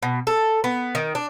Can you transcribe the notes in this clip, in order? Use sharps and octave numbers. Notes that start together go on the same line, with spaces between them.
B2
A4
B3
D#3
D4